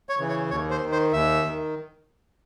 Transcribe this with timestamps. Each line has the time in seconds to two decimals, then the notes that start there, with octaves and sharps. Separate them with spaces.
0.09 C#5
0.19 C#3 E3
0.29 C#5
0.50 D#2 C#5
0.71 C5
0.81 D#3
0.92 C5
1.13 D#2 E5
1.44 D#3